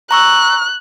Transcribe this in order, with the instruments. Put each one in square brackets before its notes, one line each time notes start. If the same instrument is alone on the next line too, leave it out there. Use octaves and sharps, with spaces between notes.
[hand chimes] A#5 C#6 E6 [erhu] F#6